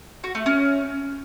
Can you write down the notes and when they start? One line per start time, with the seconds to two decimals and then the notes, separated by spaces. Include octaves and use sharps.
0.24 F#4
0.35 A3
0.46 C#4